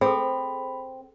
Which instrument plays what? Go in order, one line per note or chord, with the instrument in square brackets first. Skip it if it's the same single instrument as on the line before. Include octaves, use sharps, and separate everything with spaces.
[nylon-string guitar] C4 [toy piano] G#4 A4 [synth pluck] C5 [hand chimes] B5